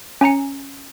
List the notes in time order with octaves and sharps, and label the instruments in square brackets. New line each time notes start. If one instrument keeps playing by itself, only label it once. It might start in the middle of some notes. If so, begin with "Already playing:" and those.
[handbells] C#4 G#5 A#5 C#7